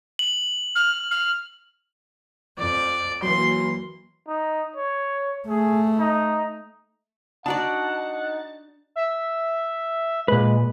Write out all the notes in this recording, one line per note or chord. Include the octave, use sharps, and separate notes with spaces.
F#7
F6
F6
F2 D5
E3 F#3 A#3 C6
D#4
C#5
A3 G#4
D#4
D4 D#4 F#4 D5 F#5 A5
E5
A#2 G#3 B4